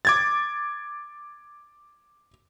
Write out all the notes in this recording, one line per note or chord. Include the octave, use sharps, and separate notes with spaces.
D6 G#6 A6